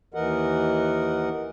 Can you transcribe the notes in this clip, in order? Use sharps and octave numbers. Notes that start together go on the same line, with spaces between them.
D#2 E3 A#4 D#5 F#5